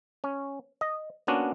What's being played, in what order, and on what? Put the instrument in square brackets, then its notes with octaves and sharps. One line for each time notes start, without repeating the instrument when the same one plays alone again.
[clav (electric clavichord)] C#4
D#5
A#3 B3 C#4 D4 F#4